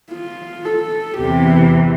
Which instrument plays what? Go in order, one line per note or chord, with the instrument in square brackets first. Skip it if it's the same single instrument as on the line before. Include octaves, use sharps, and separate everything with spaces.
[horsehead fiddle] F4
A4
[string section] E2 C3 E3 [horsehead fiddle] G4